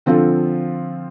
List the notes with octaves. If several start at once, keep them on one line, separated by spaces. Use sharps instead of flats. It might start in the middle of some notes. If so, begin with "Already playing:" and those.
D3 F3 C4 F4 A4